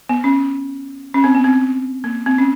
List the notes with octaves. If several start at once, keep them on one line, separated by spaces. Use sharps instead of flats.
B3
C#4
C#4
C4
B3
C4
A#3
C4
C#4